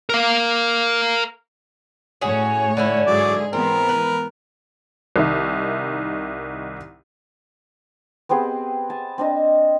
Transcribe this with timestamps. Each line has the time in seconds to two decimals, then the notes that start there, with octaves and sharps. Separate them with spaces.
0.09 A#4 F5
2.21 A2 C#4 F#4 G#4 C#5
2.77 D3 C#4 E4
3.06 G#2 F#3 G#3 G#4 D5
3.53 E3 G#3 B3 C4 A#4
3.89 B4
5.16 C2 D#3 E5
8.29 B3 C4 G4 G#4
8.90 G#5 A5
9.18 C4 D4 D#5